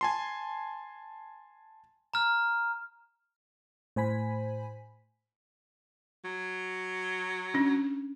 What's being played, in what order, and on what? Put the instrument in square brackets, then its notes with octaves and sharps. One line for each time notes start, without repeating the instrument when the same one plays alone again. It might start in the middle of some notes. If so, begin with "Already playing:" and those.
[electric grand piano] G#5 A5 C6
[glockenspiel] A#5 F6
[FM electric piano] A2 C5 G#5 B5 B6
[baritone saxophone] F#3
[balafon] C#4 D4